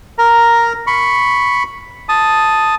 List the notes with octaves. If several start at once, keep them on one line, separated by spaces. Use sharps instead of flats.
A#4 A#5
B5 C#6
A5 D#6